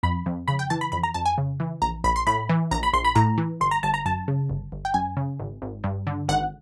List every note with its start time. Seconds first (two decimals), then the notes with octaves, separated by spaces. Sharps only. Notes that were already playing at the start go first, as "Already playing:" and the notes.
0.03 F2 B5
0.26 F2
0.48 C#3 B5
0.59 G5
0.70 E3 A5
0.81 B5
0.92 F2 B5
1.03 A#5
1.14 F2 A5
1.25 G#5
1.38 C#3
1.60 E3
1.82 A#1 A#5
2.04 A#1 B5
2.16 C6
2.27 A2 B5
2.49 E3
2.71 A#1 A#5
2.83 B5
2.93 A#1 C6
3.04 B5
3.15 A2 A#5
3.38 E3
3.60 G1 C6
3.71 A#5
3.83 G1 A5
3.94 A#5
4.06 F#2 A5
4.28 C#3
4.50 G1
4.72 G1
4.85 G5
4.94 F#2 G#5
5.17 C#3
5.39 G#1
5.62 G#1
5.84 G2
6.07 D3
6.28 G#1 F#5